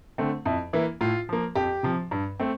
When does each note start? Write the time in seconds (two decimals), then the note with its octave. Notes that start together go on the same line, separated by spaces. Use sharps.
0.18 D3 A3 C4
0.45 F2 E4
0.73 E3 A#3 E4
1.01 A2 F4
1.29 F3 A#3
1.55 F2 G4
1.83 C3 F3
2.11 G2
2.40 A3 C4